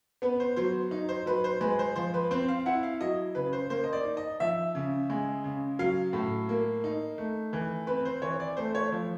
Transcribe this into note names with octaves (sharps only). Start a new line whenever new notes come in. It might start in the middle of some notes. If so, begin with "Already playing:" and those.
B3 B4
C5
F#3 C5
D#4
C5
F#3 B4
C5
G#3 B4
C5
F3 C5
B4
C4 C5
F5
E4 F#5
F5
F#3 D#5
C#3 B4
C5
A#3 C5
D#5
D5
D#4
D#5
F3 E5
C#3
G#3
C#3
F#3 F5
A2
A#3
D#4
A3
E3
C4 B4
C5
E3 C#5
D5
A3 C5
C#5
F3